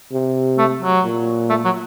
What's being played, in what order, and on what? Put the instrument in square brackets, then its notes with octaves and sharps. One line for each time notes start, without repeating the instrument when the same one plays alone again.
[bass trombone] C3
[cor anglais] A3
F#3
[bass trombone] A#2
[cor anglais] A3
F#3